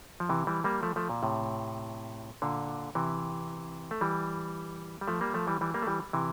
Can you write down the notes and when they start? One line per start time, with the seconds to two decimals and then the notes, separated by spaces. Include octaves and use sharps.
0.20 F3
0.29 C3 E3
0.47 E3 G3
0.64 G3 A#3
0.83 F3 A3
0.96 F3 A3
1.10 A#2
1.23 A2 C3
2.42 A#2 D3
2.95 C3 E3
3.91 A3
4.01 E3 G3
5.01 G3
5.08 F3 A3
5.21 G3 A#3
5.34 F3 A3
5.47 E3 G3
5.61 E3 G3
5.74 G3 A#3
5.82 A3
5.87 E3 G3
6.13 C3 E3